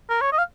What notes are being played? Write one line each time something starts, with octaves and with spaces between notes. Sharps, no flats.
A#4
C#5
D#5
F5